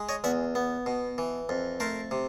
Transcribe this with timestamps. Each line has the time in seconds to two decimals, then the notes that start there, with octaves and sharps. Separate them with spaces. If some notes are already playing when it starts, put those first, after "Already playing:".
Already playing: G#3
0.09 C#5 D#5
0.24 E2 E5 F#5
0.55 B3
0.86 B2
1.18 E3
1.49 F2
1.80 A3 A#4 C5
2.11 C3